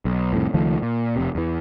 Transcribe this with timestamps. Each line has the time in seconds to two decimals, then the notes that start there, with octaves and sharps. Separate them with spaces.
0.05 B1
0.33 C2 F2 A2
0.54 C#2 D#3 F3 A3
0.82 A#2
1.16 F1 C3
1.35 E2 E3